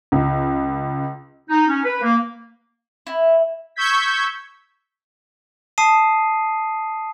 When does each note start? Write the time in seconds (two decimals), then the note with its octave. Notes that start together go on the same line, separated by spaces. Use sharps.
0.12 C#2
1.49 D#4
1.68 C#4
1.84 B4
2.01 A#3
3.07 E4
3.76 C#6 E6 G6 G#6 B6
5.78 A5 D#6 C7 D#7